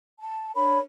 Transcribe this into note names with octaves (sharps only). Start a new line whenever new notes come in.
A5
D4 A#4 C#5 B5